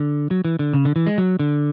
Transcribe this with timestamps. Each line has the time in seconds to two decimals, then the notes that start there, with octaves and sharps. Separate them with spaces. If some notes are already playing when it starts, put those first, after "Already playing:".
Already playing: D3
0.31 F#3
0.45 E3
0.59 D3
0.73 C#3
0.85 D3
0.96 E3
1.07 G#3
1.18 F#3
1.39 D3